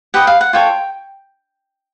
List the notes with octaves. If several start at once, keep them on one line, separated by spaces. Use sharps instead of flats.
G4 B4 D#5 F#5
F5
F#5
F4 A4 C#5 G5